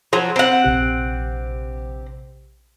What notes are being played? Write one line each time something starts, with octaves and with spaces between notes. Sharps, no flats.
F3 F#3
C4 F#5
A#1 C3 G4